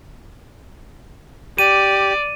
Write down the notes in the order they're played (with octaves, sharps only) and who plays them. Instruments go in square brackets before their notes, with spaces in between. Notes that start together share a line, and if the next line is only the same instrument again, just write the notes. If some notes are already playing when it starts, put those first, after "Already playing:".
[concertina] G4 [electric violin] D5 [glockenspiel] D#7